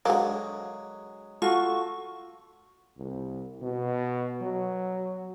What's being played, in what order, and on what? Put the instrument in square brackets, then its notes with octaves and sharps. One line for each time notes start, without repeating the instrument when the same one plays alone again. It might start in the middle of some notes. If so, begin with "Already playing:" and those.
[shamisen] D3 A#3 [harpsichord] F#3 G#3
[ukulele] F4 F#4 A4 [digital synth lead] C#6
[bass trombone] C2
B2
F#3